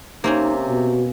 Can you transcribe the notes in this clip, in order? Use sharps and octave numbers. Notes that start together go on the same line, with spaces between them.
C3 A#3 C4 C#4 D#4
B2 F#4